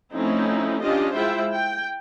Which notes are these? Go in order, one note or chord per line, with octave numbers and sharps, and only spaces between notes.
F3 A3 C4 C#4 D#4 E4
C#4 D4 F4 G4 D#5
G#3 E4 F4 C5 E5 G5
G5